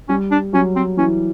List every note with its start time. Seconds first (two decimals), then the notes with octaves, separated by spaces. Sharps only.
0.09 G3 C#4
0.31 D4
0.53 F#3 C#4
0.76 C4
0.97 E3 C#4